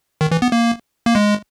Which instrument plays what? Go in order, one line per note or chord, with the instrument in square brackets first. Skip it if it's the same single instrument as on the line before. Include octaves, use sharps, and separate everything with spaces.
[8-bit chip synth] D#3
E3
B3
A#3
A#3
G#3